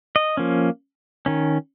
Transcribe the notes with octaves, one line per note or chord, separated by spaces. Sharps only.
D#5
F3 A#3 C#4
D#3 C#4